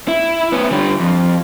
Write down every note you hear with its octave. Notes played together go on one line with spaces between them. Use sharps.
E4
B3 C#4
D3 G3
F2